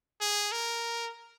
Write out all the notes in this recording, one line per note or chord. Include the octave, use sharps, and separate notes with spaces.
G#4
A#4